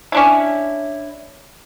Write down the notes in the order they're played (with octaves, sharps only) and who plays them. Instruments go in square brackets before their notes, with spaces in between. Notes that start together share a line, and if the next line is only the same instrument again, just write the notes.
[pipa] C#4 D4 E4